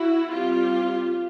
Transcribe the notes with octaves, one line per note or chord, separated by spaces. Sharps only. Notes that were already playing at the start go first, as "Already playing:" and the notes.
Already playing: E4 F#4
G3 C4 F4 G4